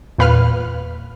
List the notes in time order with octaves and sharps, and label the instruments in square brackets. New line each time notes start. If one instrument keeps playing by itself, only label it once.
[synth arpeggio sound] E2 A#2 B4 F5 F6 F#6